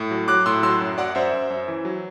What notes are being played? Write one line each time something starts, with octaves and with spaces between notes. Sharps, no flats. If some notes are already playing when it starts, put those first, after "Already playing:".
Already playing: A2
F#3
F#3 D6 F#6
A2 C6 E6
F#3 C6 E6
F#2
F#2 D5 F#5
F#2 C5 E5
F#2
F#2
E3
F#3